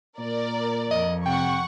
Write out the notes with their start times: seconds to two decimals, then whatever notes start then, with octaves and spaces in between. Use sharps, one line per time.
0.18 A#2 A#4 D5
0.91 F2 D#5
1.25 C3 F#5 G5 C#6